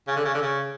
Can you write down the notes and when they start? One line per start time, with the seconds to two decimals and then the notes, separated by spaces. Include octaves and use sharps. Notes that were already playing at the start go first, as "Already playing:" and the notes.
0.07 C#3
0.16 D3
0.25 C#3
0.34 D3
0.42 C#3